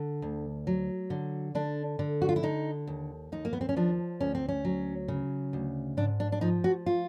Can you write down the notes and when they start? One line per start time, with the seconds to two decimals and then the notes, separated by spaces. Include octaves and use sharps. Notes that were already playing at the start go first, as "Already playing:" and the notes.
Already playing: D3
0.22 D2
0.67 F#3
1.10 D3
1.55 D3 D4
1.99 D3
2.22 F#4
2.29 F4
2.36 E4
2.43 D3 D#4
2.87 D#2
3.32 D#2 D#4
3.45 A#3
3.53 B3
3.61 C4
3.69 C#4
3.76 F3 D4
4.20 D2 C#4
4.35 C4
4.49 C#4
4.65 F#3
5.08 C#3
5.53 D2
5.97 G#2 D4
6.20 D4
6.32 D4
6.41 F3 D#4
6.64 F#4
6.86 F4